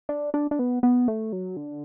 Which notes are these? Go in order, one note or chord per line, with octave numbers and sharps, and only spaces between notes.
D4
D4
D4
B3
B3
A3
F#3
D3